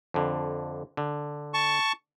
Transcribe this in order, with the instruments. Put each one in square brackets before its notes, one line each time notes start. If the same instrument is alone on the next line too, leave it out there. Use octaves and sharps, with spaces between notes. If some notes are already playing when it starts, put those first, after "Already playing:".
[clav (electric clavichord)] F2 D3
D3
[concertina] A5 C#6